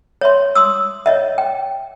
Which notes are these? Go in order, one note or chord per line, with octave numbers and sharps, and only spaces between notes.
C#5 E5 C6
C6 D#6 E6
C#5 D#5 E5
G5